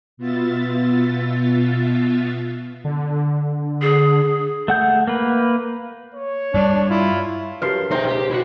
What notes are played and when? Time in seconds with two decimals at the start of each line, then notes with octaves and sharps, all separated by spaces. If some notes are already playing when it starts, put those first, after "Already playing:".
0.17 B2 B3 F4 E5 A6
2.84 D3
3.82 G#4
4.68 A3 F#5 G6
5.08 A#3 B4
6.15 C#5
6.54 G2 G3 D4
6.90 E4 F4
7.62 F#2 F3 F#4 G4 A#4 B4 C6
7.91 C#2 B2 D#4 C5 E5 G5
8.08 G4
8.31 E4 F#4